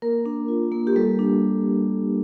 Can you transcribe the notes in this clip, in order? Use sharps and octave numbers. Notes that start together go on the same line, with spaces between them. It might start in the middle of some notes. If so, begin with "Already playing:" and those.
A#3 A#4
D4
F4
A#3
G4
G3 A4
D4